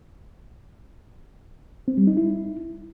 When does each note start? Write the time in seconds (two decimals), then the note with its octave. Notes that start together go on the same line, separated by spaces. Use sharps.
1.88 C4
1.97 G3
2.07 D#4
2.17 E4